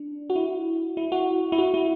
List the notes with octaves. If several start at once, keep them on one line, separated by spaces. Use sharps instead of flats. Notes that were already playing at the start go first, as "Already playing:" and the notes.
Already playing: D4
F#4
E4
E4
F#4
E4
F#4
E4